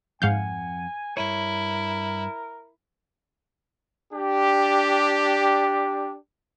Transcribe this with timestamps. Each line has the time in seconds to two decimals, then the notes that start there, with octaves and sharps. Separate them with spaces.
0.22 F2 G#2 F5 F#5 G#5 G6
1.17 G2 E4 A#4 C#5
4.13 D4 G4